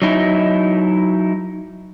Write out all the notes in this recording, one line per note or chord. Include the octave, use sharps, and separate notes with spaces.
F#3 D#4 E4